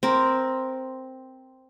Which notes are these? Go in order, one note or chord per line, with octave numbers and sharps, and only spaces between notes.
C4 A#4